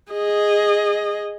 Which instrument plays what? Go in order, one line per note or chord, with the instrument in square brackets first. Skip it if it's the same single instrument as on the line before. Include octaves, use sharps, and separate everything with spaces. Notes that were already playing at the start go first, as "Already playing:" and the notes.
[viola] G#4 D#5